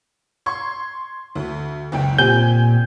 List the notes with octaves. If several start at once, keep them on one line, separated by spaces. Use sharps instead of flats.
C6 C#6 G#6
D2
F#1 C#2 G5
A#2 C4 G4 G#5 G6